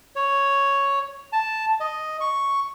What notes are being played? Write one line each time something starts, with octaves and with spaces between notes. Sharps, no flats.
C#5
A5
D#5
C#6